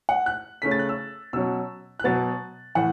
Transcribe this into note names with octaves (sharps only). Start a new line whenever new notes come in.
F#5
F#6
C#3 A3 C#4 B6
A6
F#6
E6
B2 F#3 C#4 E6
F#6
B2 F#3 B3 A6
A2 E3 F#5